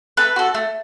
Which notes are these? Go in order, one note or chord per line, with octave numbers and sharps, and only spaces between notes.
A3 B4
F#4 A4
A3